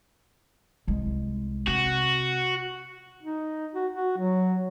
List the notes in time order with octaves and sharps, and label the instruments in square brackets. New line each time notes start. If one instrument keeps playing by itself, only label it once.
[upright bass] C2 G#3
[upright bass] C3 [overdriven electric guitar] F#4
[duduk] D#4
F#4
F#4
F#3